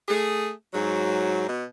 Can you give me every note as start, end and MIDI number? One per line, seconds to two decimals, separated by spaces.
0.08 0.50 57
0.08 0.50 68
0.74 1.47 44
0.74 1.47 54
1.47 1.64 47